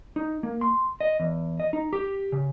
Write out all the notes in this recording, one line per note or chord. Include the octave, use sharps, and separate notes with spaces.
D#4
A#3
C6
D#5
E2
D#5
D#4
G4
C#3